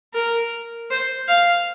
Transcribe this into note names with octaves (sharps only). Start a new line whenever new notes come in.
A#4
C5
F5